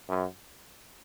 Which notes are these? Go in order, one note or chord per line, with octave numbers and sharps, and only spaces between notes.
F#2